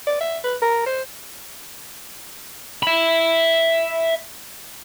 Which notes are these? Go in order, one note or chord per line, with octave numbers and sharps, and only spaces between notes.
D5
E5
B4
A#4
C5
E5 B5